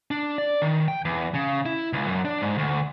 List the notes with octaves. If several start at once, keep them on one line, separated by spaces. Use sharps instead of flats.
D4
D5
D#3
G5
E2
C#3
E4
C#2
F#2
D4
G#2
D2